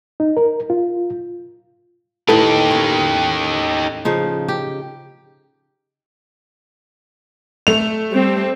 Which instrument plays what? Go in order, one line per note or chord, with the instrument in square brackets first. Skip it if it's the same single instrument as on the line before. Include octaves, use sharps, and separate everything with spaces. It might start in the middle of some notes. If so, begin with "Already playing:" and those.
[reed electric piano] D#4
A#4
F4
[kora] A2 E4 B4 [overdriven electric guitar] D#4 G4 [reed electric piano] A4
[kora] C#4
C#3 F3 D#4
G4
[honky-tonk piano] A3 F7
[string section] G3 C4